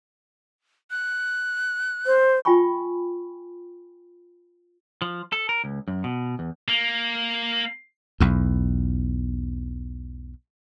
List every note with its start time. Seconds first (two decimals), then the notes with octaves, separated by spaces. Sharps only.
0.91 F#6
2.06 C5
2.45 F4 G5 G#5 B5 C#6
5.02 F3
5.32 A4
5.49 A#4
5.64 C#2
5.88 F#2
6.04 B2
6.39 E2
6.68 A#3
8.20 B1 E2